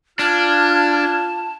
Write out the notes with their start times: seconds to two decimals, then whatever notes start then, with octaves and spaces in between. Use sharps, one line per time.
0.19 D4 F4 A5 F6 G#6